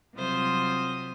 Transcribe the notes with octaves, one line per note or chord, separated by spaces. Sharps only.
C3 F#3 G3 F4 C5 D#6